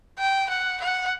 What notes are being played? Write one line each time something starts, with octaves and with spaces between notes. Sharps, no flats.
G5
F#5
F#5